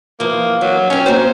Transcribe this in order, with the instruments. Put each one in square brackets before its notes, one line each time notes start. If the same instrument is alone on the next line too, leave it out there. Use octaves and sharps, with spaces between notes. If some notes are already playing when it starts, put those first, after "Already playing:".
[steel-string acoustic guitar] E3 F3 [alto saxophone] A#3
[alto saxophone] F#3 [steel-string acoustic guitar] C#5
[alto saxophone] C#4 [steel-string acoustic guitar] C#5 G5
[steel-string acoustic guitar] A#3 C4 F#4 [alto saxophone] C5